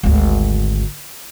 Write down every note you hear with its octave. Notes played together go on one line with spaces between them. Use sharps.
G#1 D2